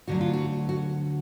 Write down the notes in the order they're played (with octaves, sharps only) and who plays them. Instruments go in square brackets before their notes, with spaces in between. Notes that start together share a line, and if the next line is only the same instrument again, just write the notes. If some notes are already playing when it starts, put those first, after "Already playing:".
[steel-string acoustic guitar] D2 D3 F#3 F#4
F4
F#4
F#4